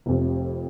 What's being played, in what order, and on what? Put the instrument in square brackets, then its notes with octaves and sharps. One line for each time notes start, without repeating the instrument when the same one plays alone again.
[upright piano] F1 F2 C3